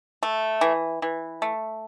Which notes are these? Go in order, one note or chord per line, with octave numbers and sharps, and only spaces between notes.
A3
E3
E3
A3